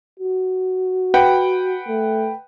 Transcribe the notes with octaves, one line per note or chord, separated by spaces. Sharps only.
F#4
B4 F#5 G5
A3